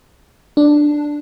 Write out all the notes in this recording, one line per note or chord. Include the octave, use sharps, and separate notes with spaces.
D4